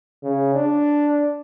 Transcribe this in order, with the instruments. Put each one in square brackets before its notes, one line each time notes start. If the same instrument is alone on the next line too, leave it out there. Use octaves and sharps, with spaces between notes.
[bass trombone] C#3
D4